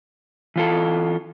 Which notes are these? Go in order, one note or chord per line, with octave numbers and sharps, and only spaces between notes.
E3 F4 A4